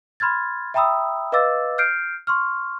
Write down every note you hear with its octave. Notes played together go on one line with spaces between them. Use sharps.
B5 C6 F6 G#6 A6
E5 G5 A#5 B5 D#6 E6
B4 D#5 F5 D6 E6 A6
F6 G6 C7 D7
C6 C#6 F6